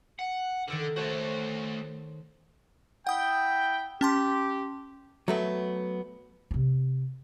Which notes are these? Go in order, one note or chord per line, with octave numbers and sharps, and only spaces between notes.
F#5
D3 D#3 A4 A#4
A3 F#4 C5 C#5 A5
E4 F#5 G5 D#6
C#4 G4 A5 C6
F#3 A3 B3
C3 C4